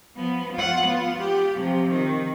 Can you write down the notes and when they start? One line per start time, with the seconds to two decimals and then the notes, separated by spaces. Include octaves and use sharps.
0.15 F3 B3
0.53 F4 F#5
0.83 B3 F4
1.18 G4
1.56 C3 F3
1.91 D#3